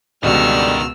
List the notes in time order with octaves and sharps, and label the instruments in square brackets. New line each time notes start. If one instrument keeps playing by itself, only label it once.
[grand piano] C#2 B2 [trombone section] D3 G3 [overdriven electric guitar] D#3 F#4 [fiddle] E6 F6